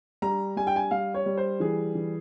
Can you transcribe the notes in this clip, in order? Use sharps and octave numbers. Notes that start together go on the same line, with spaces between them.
G3 A#5
G3 G#5
G5
G#5
G3 F5
C#5
G3
C5
E3 G#4
E3